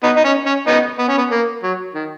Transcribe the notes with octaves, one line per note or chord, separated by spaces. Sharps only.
B3 D#4
D#4
C#4
C#4
B3 D#4
B3
C#4
B3
A#3
F#3
D#3